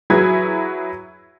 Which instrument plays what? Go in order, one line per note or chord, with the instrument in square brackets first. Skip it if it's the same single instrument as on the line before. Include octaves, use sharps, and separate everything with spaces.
[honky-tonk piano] F#3 E4 G#4 B4 G#6